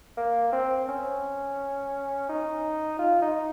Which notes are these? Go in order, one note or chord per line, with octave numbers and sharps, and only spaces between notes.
A#3
C4
C#4
D#4
F4
D#4